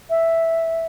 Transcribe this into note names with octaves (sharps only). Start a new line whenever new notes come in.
E5